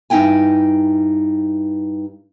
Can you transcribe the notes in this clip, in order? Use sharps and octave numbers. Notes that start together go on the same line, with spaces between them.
G2 D#4 E4 G5 G#5